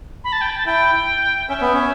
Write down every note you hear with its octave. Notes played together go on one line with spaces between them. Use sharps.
B5
A5
G5
A5
E4 G5
C#4 E5
B3
C#4